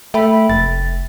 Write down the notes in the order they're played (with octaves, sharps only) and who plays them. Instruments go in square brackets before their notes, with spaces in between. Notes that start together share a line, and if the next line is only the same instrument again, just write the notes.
[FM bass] A3 [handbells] E5 G5 B5
[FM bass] F1 [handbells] A6